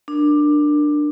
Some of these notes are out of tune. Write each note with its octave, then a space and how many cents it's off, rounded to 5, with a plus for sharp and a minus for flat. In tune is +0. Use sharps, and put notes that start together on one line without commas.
D4 +15 A#4 +0